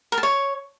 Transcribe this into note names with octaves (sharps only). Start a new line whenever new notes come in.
A#4
A5
C#5